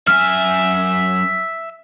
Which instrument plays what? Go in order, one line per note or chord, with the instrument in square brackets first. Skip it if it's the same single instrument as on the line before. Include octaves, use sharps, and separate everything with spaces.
[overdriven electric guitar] F#2 G#5 [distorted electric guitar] E5 [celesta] F6